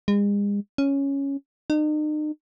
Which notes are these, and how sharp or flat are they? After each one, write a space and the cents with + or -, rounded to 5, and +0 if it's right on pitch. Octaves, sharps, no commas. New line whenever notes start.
G#3 -40
C#4 +0
D#4 -40